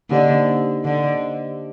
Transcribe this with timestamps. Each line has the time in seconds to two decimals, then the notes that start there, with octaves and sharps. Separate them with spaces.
0.09 D3 A#3 D#4 G4 C5 D#5
0.84 D3